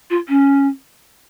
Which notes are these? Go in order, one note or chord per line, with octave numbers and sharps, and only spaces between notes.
F4
C#4